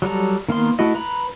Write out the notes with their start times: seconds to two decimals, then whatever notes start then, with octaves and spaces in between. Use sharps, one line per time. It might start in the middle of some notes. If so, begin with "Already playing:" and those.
0.02 F#3 G3 A4 A#5
0.48 D#3 A#3 B3 C6
0.79 A3 E4 F#4 D#5
0.94 B4 A#5 B5